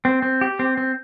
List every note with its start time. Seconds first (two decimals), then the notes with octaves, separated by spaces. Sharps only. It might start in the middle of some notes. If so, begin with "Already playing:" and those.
0.05 C4
0.22 C4
0.41 G4
0.59 C4
0.77 C4